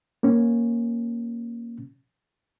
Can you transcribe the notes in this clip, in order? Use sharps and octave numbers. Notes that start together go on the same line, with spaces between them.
A#3 C#4